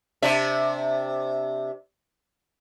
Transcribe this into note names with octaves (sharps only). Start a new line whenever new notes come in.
C3 D4 E5